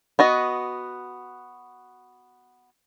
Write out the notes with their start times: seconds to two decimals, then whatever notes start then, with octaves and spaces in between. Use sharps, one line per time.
0.19 B3 F#4 D#5